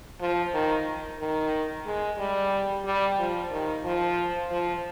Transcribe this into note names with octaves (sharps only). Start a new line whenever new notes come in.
F3
D#3
D#3
G#3
G3
G3
F3
D#3
F3
F3